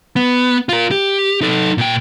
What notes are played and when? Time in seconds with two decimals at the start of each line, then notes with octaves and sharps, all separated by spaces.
0.16 B3
0.69 F4 A#4
0.91 G4
1.41 D#4 A4
1.78 A#2 G5